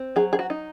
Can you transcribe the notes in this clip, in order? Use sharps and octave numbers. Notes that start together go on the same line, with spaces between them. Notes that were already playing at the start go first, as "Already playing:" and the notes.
Already playing: C4
F#3 G#4
G#4
F#4
D#4